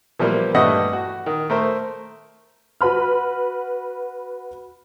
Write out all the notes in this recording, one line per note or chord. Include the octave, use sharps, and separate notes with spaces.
E3 F3 G3 A#3 B3
G2 E3 G3 A3 D#5 F#5
F#4
D#3
A3 A#4 C5
F#4 B4 B5 F6